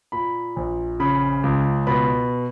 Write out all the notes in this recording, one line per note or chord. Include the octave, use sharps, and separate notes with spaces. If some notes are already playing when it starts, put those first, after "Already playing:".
A#2 B5
A#1
C#3 B5
C#2
B2 B5